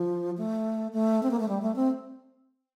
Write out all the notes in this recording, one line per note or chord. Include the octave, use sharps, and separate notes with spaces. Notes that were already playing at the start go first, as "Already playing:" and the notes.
Already playing: F3
A3
A3
C4
A#3
A3
G3
A3
C4